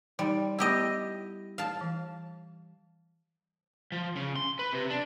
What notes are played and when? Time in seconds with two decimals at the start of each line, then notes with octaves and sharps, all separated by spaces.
0.19 G3 D#4
0.59 B3 E4 G4 D#5 F#5
1.58 F5 A5
1.81 E3
3.92 F3
4.16 C#3
4.36 C6
4.59 B4
4.73 C3
4.90 D4